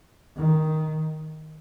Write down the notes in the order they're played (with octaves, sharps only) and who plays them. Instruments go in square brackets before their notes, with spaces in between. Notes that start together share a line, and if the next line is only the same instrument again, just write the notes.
[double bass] D#3